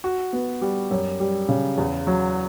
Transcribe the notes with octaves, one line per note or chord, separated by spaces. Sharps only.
F#4
B3
G3
F#2
G3
C#3
E2
F#3